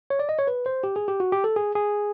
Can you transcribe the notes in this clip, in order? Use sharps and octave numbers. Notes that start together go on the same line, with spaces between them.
C#5
D5
D#5
C#5
B4
C5
G4
G#4
G4
F#4
G4
A4
G#4
G#4